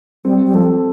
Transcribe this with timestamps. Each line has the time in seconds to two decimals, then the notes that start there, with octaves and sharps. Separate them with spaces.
0.25 G3 C4
0.46 G3
0.54 F3 A4